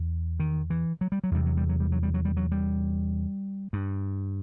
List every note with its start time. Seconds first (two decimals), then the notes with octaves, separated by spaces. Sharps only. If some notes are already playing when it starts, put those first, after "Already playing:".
Already playing: E2
0.40 D#3
0.70 E3
1.01 F#3
1.12 G3
1.24 F#3
1.31 E2 C3 G3
1.46 F#3
1.57 G3
1.69 F#3
1.80 G3
1.92 F#3
2.03 G3
2.14 F#3
2.25 G3
2.37 F#3
2.52 G3
3.73 G2